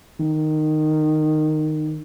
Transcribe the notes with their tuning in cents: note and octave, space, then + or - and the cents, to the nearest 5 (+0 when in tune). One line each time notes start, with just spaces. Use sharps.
D#3 -10